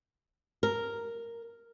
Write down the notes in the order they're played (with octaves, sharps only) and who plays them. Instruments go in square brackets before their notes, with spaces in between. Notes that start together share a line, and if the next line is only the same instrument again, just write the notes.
[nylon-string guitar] A#4